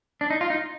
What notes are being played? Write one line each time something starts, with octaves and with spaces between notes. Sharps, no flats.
D4
D#4
F4
D#4